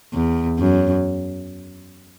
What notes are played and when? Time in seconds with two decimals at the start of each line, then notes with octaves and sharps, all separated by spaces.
0.14 E2
0.59 F#2